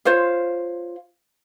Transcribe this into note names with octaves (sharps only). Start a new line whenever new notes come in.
F4 C5 C#5 F5